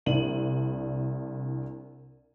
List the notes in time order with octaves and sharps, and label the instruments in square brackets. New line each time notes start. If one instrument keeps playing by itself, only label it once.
[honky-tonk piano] C2 D4 E4 D#7 F#7